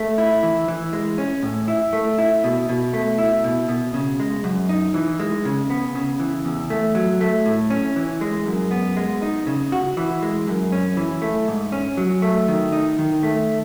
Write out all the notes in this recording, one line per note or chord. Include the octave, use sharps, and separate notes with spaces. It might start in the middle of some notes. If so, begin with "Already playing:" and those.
Already playing: A3
E4
E3
E3
G#3
C#4
A2
E4
A3
E4
B2
B2
A3
E4
B2
B2
C#3
G#3
F#2
D#4
E3
G#3
C#3
B3
C#3
E3
E2
A3
F#3
A3
A2
C#4
E3
G#3
F#2
B3
G#3
D#4
C#3
F#4
E3
G#3
F#2
C#4
E3
A3
G#2
C#4
F#3
A3
D#3
D#4
D#3
A3